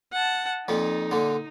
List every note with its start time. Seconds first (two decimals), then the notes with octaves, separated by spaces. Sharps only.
0.13 F#5 A5
0.68 F2 A#2 F3 D#4
1.11 A#2 D3